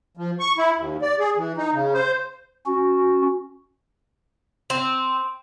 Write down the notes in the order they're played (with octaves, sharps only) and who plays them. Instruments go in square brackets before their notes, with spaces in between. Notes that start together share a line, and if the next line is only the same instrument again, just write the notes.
[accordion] F3
C#6
E4
D#2
D5
G#4
E3
D#4
C#3
C5
[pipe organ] C#4 F#4
[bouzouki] C4